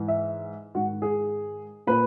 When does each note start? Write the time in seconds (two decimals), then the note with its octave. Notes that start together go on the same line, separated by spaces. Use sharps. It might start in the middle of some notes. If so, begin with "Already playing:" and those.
Already playing: G#2 E3
0.08 E5
0.75 G#2 D#3 F#4
1.02 G#4
1.87 A#2 B4